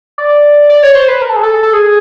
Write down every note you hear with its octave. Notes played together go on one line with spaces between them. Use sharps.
D5
D5
C#5
C5
B4
A#4
A4
G#4
A4
A4
G#4